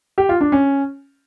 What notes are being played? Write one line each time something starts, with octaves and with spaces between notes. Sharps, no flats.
G4
F4
D4
C#4